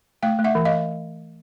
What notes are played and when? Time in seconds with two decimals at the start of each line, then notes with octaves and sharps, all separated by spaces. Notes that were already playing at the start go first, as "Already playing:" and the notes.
0.23 A3 F5 G5
0.39 A3
0.44 E5 F#5
0.55 E3
0.65 D#5 F5